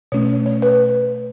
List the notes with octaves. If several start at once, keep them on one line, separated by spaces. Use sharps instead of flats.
B2 A3 C#4 C#5
C#5
B4